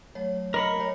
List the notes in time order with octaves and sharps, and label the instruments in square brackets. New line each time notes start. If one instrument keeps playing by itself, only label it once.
[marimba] F#3 A3 [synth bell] C#5
[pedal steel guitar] A#4 B5 [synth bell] D#5 C#7
[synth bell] A3 C#5